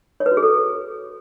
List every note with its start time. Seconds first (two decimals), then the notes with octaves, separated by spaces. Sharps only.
0.20 C#5
0.26 B4
0.32 F#4
0.37 G#4
0.43 A4